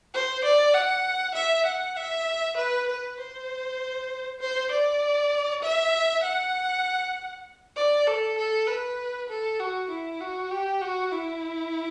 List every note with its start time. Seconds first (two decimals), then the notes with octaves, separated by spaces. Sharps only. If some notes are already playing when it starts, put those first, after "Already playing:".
0.14 C5
0.44 D5
0.74 F#5
1.35 E5
1.66 F#5
1.96 E5
2.57 B4
2.88 B4
3.19 C5
4.40 C5
4.71 D5
5.63 E5
6.23 F#5
7.76 D5
8.07 A4
8.38 A4
8.67 B4
9.29 A4
9.59 F#4
9.90 E4
10.21 F#4
10.51 G4
10.81 F#4
11.12 E4